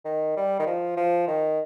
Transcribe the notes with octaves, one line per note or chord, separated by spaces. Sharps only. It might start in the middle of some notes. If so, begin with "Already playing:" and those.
D#3
G3
D#3
F3
F3
D#3